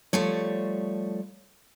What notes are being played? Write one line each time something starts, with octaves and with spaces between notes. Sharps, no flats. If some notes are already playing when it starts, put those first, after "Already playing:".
F3 G3 A3 C#5